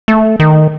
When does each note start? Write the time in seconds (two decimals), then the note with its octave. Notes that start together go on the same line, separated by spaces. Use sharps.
0.08 A3
0.40 D#3